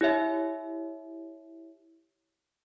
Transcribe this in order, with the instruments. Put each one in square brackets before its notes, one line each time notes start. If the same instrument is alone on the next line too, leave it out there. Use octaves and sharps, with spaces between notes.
[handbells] E4 G4 C#5 E5